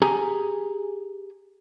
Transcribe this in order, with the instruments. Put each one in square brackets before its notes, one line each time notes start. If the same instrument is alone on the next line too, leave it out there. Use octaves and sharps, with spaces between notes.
[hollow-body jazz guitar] G4 G#4 G#5 A#5